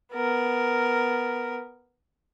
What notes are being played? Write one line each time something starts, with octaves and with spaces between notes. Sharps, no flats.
B3 A#4